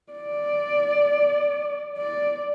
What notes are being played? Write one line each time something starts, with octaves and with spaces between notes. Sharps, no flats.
D5
D5